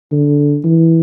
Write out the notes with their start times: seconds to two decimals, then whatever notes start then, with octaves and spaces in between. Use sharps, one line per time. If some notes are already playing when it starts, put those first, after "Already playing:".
0.12 D3
0.64 E3